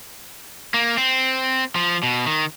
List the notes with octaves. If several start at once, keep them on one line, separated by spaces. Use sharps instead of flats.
A#3
C4
F3
B2
D#3